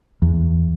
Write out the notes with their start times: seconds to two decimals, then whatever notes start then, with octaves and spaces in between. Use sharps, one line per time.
0.22 E2